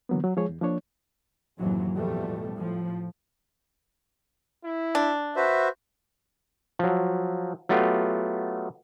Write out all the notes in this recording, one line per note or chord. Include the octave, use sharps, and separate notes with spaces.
D3 E3 F#3 A#3 B3
F#3
F3 G#3 G#4 C#5
E2
F3 A#3 D4 C#5
F#1 D#2 A2 E3 F#3 C4
A1 E2 B2 F3 G3 A3
A2 F3
E4
D4
F#4 B4 C5 E5
F3 F#3
F#3 A3 B3 F4 G4